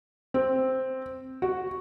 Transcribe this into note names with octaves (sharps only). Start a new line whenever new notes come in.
C4
F#4